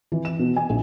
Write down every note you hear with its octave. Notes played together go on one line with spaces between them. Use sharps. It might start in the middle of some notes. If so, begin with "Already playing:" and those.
E3
E7
B2
G#5
A#1